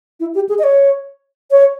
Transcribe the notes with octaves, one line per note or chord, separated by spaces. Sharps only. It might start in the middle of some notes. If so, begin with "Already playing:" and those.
E4
G4
G#4
D#5
C#5
C#5